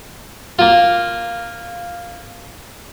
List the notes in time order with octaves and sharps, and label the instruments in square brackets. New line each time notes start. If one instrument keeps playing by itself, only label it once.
[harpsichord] A#3 F4